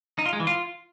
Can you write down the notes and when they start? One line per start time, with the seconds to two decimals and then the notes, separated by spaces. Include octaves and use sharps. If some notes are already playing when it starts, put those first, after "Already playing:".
0.19 D#4
0.26 F4
0.33 G#3
0.40 E3
0.47 F4